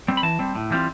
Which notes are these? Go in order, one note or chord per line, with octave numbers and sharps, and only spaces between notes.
G3 C4
B5
E3 A5
G3 C4
A2
E3 G3 C4 F4